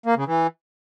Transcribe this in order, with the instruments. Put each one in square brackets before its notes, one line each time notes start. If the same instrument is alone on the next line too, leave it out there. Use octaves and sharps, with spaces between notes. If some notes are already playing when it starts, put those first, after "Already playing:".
[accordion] A#3
C#3
E3